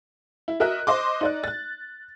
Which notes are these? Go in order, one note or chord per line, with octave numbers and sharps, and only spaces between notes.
E4
F#4 A#4 D#5 E5 F#6
C5 D#5 C6 D6
D#4 D5 F#6
F#6 A6